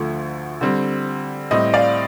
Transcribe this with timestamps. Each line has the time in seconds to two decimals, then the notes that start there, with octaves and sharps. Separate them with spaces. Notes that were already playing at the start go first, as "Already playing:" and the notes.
Already playing: D2 D3 F3 A3
0.61 D3 G3 C4
1.51 A2 G3 C4 D#5
1.73 D5 F5